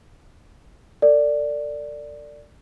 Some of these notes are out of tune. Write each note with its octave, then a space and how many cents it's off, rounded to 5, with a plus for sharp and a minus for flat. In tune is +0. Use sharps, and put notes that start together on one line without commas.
A4 +45 D5 +0